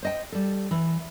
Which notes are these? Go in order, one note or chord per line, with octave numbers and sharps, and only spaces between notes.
C5 D#5 G5
G3 A4
E3